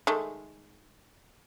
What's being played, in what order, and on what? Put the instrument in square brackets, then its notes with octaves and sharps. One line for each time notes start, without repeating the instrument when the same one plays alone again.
[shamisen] D#3 G#3 A3